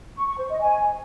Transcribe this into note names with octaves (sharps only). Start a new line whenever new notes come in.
C#6
C#6
C5
D#5
G#5